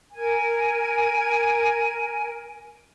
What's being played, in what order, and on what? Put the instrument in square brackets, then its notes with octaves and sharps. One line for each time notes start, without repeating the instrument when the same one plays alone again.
[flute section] A#4 G#5